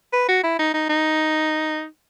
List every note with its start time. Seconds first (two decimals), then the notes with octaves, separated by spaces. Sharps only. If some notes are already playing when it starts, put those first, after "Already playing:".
0.13 B4
0.28 F#4
0.44 E4
0.59 D#4
0.74 D#4
0.89 D#4